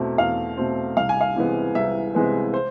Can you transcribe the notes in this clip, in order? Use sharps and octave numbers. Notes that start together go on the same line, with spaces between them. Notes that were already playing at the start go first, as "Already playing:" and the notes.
Already playing: E2 B2 A3 C4
E2 F5
B2 A3 C4
C2 F5
G#5
F5
C3 E3 G#3 B3
C2 E5
C3 E3 G#3 B3
C5